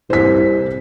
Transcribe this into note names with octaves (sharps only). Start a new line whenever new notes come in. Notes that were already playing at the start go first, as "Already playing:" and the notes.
C2 C5 B6